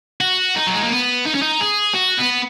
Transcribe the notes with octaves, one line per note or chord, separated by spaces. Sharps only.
F#4
D#4
F#3
G#3
A#3
B3
D#4
C#4
D#4
G#4
F#4
B3